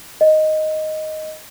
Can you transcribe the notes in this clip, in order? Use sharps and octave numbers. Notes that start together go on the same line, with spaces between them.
D#5